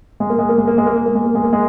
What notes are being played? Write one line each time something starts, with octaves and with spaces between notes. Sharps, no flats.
G#3
A#3
G#3
A#3
G#3
A#3
G#3
A#3
G#3
A#3
G#3
A#3
G#3
A#3
G#3